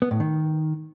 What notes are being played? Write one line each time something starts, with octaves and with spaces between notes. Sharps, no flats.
B3
A2
D#3